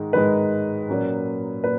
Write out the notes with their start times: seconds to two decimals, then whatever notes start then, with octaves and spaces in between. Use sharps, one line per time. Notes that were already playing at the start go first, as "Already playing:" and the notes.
Already playing: G#2 D#3 G#3
0.13 G#2 D#3 G#3 B4
0.89 A#2 F#3 A#3 C#4
1.64 A#2 B4